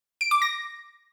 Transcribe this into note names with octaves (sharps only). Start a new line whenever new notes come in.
D7
D6
A#6